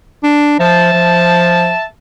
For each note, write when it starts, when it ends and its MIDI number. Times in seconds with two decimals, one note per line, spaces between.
0.23 0.54 62
0.59 0.93 53
0.59 1.85 76
0.59 1.85 81
0.93 1.73 53